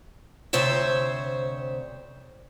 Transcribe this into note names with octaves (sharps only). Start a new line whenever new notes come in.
D2 C3 C5 C#5 E5